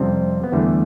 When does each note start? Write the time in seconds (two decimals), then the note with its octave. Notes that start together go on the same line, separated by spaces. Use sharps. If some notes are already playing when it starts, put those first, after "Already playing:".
Already playing: F2 C3 G3 C4
0.44 B3
0.52 E2 D3 G3 A3